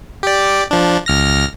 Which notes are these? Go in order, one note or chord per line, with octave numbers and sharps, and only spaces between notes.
G4 D5
F3 D4
C#2 F6 A#6